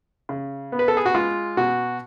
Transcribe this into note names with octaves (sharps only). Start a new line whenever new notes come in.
C#3
B3
B4
A4
G#4
F#4
G#3 F4
B2 F#4